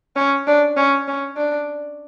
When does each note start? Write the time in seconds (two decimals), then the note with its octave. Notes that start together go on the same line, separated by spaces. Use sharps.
0.16 C#4
0.47 D4
0.77 C#4
1.08 C#4
1.37 D4